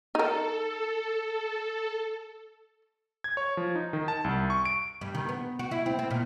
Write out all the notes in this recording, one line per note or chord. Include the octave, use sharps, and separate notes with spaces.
D#4 A4 A#4
G#6
C#5
F3
D#4
D#3
A5
C2
C#6
D7
G2
D#3
B3
F#4
E4
C4
C4
A#2